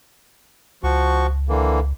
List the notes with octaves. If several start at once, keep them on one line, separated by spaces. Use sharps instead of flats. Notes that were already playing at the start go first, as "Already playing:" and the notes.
C#2 F3 F#4 C#6
D3 E3 A#3